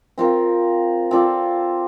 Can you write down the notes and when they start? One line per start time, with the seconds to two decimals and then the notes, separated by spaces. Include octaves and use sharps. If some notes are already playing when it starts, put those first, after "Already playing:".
0.18 C4 F4 A#4
1.11 C4 F4 A4 D5